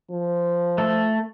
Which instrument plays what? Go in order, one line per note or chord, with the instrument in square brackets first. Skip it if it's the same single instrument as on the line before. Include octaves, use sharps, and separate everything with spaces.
[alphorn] F3
[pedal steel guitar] A3